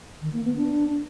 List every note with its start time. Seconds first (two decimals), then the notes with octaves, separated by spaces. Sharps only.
0.21 D#3
0.33 A#3
0.44 B3
0.56 D4